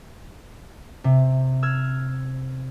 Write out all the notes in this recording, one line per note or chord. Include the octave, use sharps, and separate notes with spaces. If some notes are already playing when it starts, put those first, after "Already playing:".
C3
E6 F6 G#6